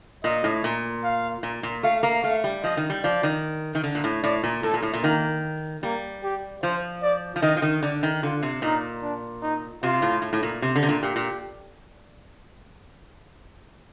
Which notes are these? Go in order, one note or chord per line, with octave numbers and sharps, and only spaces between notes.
A#2 D#5
A2
A#2
F5
A#2
A#2
A3 F5
A#3
A3 F5
G3
F3 D#5
D#3
G3
F3 D5
D#3
D#3
D3
A#2
A2
A2 D5
A#2
A2 A4
A#2
A2
A#2
D#3 A#3
G3 A#3
G4
F3 C5
D5
F3
D#3 D#5
F3
D#3
D3 D5
D#3
D3 F4
C3
A#2 D#4
D4
D#4
C3 F4
A2
A2
A2
A#2
C3
D3
C3
A#2
A#2 G4
A#2